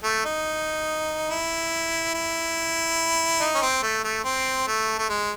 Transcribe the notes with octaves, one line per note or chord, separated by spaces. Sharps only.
A3
D#4
E4
E4
D#4
C#4
C4
A3
A3
C4
A3
A3
G#3